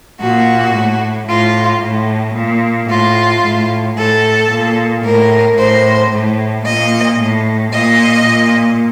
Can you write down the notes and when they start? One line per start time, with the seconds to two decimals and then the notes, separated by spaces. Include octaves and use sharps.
0.21 A#2 F#4
0.75 A2
1.29 A2 F4
1.83 A2
2.36 A#2
2.90 A2 F4
3.44 A2
3.97 A2 A4
4.51 A#2
5.05 A2 A#4
5.58 A2 C5
6.12 A2
6.66 A#2 D#5
7.20 A2
7.73 A#2 D#5
8.27 A#2